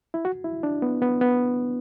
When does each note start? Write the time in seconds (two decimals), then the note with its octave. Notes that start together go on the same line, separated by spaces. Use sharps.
0.14 E4
0.25 F#4
0.44 E4
0.63 D4
0.82 B3
1.02 B3
1.21 B3